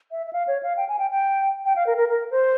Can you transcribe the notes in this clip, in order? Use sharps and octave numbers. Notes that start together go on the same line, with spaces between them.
E5
E5
F5
C#5
F5
G5
G#5
G5
G5
G5
F5
A#4
A#4
A#4
C5